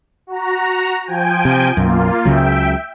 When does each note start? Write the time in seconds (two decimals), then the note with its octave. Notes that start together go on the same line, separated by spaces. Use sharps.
0.27 F#4 A#5
1.05 F3 G5 G#5
1.45 C3
1.77 B1 F#2 A#3 F4
2.25 C#2 C#3 F#3 E5 G5